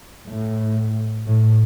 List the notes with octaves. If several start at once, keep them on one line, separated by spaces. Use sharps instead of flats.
A2
A2